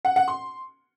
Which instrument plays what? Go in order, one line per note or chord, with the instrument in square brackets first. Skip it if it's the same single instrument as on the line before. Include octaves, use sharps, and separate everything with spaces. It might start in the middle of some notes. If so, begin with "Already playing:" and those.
[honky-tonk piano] F#5
F#5
C6